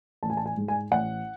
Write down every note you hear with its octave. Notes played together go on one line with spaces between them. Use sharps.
A1 A5
G#5
A5
G#5
G#2 G#3
G#5
A1 F#5